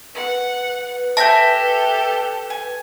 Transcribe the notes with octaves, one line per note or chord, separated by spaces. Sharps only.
B4 F#5
G4 A4 E5 G#5 A5 G6 A#6
G#5